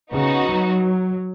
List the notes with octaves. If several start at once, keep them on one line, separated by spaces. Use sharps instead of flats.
C#3 B3 D#4 F#4
F#3